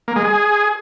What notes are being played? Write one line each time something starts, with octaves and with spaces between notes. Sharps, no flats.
A#3
G#3
G#4